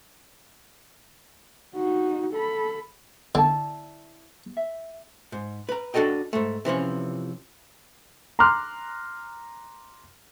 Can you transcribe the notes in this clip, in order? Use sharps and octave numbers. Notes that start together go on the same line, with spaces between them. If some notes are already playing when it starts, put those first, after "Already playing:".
D#4 F#4
A4 B5
D3 E4 D5 A5
E5
G#2
B4 A#5
D4 F#4 A4 D#5 G5
G#2 A3
C3 E3 F3 C#4
A#5 C6 D6 F6 F#6